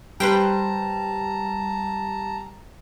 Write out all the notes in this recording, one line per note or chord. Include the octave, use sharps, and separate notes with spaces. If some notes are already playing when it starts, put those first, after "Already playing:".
G3 B4 C5 G5 A5 A#5